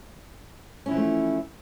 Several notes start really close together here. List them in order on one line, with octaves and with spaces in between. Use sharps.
C#4 E4 E3 F3 A3